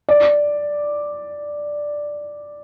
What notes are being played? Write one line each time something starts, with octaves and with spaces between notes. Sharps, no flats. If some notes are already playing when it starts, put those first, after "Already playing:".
D5